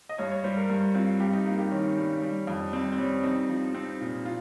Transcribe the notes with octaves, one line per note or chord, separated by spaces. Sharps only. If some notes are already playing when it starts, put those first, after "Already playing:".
D#5
G2 C#5
C#5
G3 C5
A#4
G2
C4 F4
G2 G4
D#4
A#3 D#4
G4
D#3 C#4
G3
G3
F2
G3 C4
C4
G3 C#4
C4 D#4
F3
C4
A#2
F4